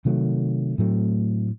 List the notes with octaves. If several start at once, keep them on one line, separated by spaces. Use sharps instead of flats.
C3 D#3 F#3 A3
A2 F#3 A3 C4